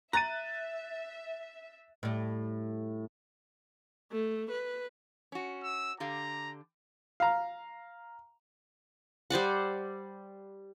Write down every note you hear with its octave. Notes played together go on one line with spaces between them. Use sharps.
E5 A#5 F#6 A6 D#7
A2 G3
A3
B4
C#4 F#4
E6
D3 G4 F5 A#5
F5 A#5
G3 C5 D5 F#5